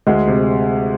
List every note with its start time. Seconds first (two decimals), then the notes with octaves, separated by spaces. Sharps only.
0.07 D2 G#3
0.27 C3